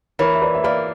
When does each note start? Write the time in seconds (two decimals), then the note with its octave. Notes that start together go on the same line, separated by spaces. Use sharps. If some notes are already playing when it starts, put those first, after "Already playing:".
0.19 E3 A#4 C#5
0.35 E5
0.42 B4 D5
0.55 E5
0.64 A#3 B4 D5